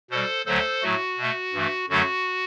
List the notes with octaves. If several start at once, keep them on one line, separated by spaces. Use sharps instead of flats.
B2 G3 A4 C5
D2 D3 F#3 A3 A4 C5
A2 F#3 A3 F#4
B2 A3
G2 E3 A3
F#2 D3 F#3 A3 F#4